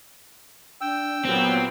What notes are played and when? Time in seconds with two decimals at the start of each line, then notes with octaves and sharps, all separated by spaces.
0.81 D4 G5 E6
1.25 A#2 F#3 B3 C4 G4